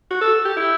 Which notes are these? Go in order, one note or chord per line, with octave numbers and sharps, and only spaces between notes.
F#4
A4
G4
E4